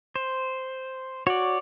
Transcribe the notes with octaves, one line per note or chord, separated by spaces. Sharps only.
C5
F#4 C#5 D5